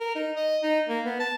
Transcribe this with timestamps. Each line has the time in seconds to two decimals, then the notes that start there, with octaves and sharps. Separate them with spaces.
0.01 A#4
0.15 D#4
0.36 D#5
0.63 D#4
0.89 A#3
1.05 B3
1.20 A5